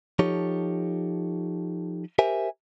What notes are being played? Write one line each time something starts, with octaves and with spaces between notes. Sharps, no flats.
F3 D#4 G4 A4 C#5
G4 A#4 C5 E5 G#5